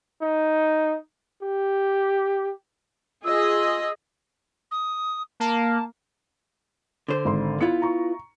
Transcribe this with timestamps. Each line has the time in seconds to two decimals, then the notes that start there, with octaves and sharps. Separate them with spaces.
0.22 D#4
1.43 G4
3.24 F4 G#4 D#5 E6
4.71 D#6
5.40 A#3 A5
7.09 D3 C5
7.25 G#1 A4 C6
7.61 B3 E4 F4 C#7
7.82 A#5 C#6